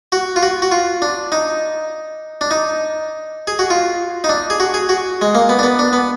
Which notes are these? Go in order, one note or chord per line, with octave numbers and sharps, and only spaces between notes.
F#4
F4
F#4
F#4
F4
D4
D#4
D4
D#4
G#4
F#4
F4
D#4
D4
G#4
F#4
G#4
F#4
G#3
A#3
B3
D4
B3
D4
B3